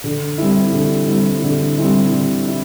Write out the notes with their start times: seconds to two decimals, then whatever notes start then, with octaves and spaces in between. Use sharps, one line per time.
0.04 D3
0.38 G3 C4 E4
0.73 D3
1.08 G3 C4 E4
1.43 D3
1.78 G3 C4 E4
2.12 D3
2.48 E4